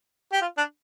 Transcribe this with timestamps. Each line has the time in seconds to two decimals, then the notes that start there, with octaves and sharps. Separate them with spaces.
0.33 G4
0.42 F4
0.58 D4